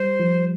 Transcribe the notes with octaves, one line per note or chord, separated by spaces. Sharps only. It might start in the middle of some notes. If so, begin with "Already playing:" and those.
Already playing: G3 C5
F3